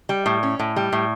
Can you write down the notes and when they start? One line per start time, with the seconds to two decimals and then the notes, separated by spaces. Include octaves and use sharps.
0.09 G3
0.26 A2
0.43 C#4
0.59 A2
0.76 G3
0.93 A2